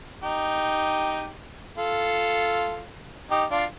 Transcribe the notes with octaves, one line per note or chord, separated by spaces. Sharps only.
D#4 G4
F4 A4
D#4 G4
D4 F4